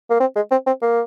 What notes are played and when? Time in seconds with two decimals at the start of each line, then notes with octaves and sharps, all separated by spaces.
0.10 A#3
0.20 C4
0.36 G#3
0.51 C4
0.67 C4
0.82 A#3